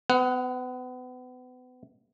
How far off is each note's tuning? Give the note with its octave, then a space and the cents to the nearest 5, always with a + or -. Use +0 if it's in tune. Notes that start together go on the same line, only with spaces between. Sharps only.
B3 +35 F#5 +0